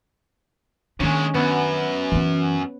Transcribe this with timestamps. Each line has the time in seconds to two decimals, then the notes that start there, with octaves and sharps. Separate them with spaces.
1.00 A#2 D#3 G#3 C#4 D4
1.34 F#2 B3
2.12 E3 C#4